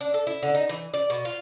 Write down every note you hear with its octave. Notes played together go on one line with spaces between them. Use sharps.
D4
A4
E4
D3
D#4
E3
D5
B2
F4